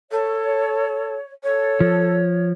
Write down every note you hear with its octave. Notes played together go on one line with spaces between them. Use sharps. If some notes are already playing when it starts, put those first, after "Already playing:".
A4 C#5
A4 C#5
F3